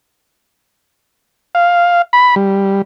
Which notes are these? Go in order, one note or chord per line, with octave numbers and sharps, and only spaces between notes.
F5
B5
G3